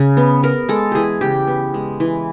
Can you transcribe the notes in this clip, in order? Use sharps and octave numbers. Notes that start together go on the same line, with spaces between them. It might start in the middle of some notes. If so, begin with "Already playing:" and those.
Already playing: C#3
B3
B3 A#4
G#3 A4
E3 G4 G#4
C#3 G4
B3
G#3
E3